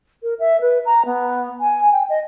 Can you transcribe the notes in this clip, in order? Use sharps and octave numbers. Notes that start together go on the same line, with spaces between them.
A#4
E5
B4
A#5
B3
G#5
G5
D#5